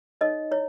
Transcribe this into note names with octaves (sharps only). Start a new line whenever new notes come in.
D#4 A4 C#5 D#5
E4 C#5